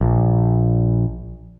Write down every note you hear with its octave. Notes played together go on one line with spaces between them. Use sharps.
A#1